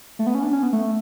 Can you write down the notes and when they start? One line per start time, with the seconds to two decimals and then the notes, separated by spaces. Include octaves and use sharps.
0.19 A3
0.27 B3
0.35 C#4
0.43 D4
0.53 C#4
0.62 B3
0.73 A3